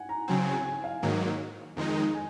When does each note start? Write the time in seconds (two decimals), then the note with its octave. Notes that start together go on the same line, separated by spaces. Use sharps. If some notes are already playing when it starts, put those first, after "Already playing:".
Already playing: F#5 G#5
0.09 A#5
0.28 C#3 F#3 C4 G#5
0.47 G#5
0.65 G#5
0.84 F5
1.02 G#2 D#3 F#3 A#3
1.77 F2 D#3 G#3 D#4
2.15 G#5